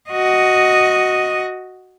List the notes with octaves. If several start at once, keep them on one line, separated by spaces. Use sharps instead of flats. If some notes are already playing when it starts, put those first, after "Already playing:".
F#4 D#5